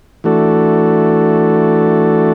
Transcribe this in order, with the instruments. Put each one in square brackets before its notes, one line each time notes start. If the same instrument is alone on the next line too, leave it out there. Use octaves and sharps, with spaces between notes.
[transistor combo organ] E3 A3 D4 F#4 A4